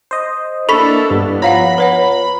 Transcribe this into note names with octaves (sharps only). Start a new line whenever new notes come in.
C5 D#5
A#3 D4 E4 A4 B5 C#6 B6
G2 B3
F3 C#5 F5 F#5 A#5 B5
B4 C#5 F#5